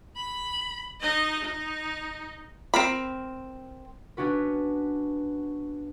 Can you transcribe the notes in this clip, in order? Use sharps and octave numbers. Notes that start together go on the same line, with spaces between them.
B5
D#4 D#5
D#4
C4 A#4 B5
B3 C#4 D4 F#4 B4